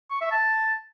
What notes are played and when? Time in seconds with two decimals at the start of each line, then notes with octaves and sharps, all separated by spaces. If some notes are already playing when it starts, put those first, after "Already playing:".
0.11 C#6
0.21 E5
0.31 A5